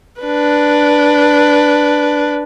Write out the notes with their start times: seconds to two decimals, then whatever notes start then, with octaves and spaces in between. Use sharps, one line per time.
0.21 D4 B4